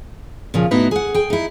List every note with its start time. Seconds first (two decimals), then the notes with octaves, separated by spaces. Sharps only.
0.54 A#2 C#3 F3
0.71 A2 B3 D#4 E4 F#4 B4
0.91 G#4 F#5
1.14 G#4 G5
1.30 D#4 E4